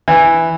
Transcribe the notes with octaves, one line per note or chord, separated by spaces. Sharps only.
E3